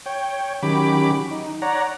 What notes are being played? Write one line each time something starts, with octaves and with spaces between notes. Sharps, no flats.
C#5 G5
D#3 F#3 C#4 G4 B5 D6
D#4
C#5 D5 F#5 A#5